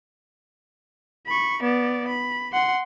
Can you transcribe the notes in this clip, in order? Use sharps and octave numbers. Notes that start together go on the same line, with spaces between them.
B5 C#6
B3 D5
B5
F#5 C6